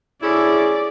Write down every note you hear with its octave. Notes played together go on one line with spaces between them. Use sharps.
D2 C#4 E4 G#4 D5